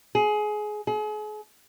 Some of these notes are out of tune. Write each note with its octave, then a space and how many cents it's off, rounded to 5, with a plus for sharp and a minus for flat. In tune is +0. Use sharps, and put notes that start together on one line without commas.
G#4 +20
G#4 +40